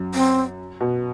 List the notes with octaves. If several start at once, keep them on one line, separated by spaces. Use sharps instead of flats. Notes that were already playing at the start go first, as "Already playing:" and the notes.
Already playing: F#2
C4
B2